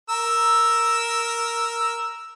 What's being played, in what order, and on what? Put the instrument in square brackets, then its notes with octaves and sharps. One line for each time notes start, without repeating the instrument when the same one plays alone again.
[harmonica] A#4 E6